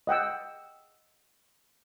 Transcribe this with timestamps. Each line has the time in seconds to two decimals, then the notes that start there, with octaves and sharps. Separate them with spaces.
0.07 D#5 F#5 G5 E6